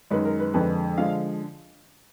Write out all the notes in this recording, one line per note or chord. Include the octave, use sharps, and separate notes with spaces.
F#2 D#3 G#3 B4
A#4
B4
F2 D3 G#3 B4
D3 F3 G#3 F5